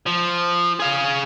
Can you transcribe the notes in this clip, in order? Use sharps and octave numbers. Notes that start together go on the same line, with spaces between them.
F3
G#4 F5